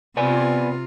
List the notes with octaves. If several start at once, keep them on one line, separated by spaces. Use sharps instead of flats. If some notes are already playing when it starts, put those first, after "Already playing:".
C3 B3 F4 D5 G#5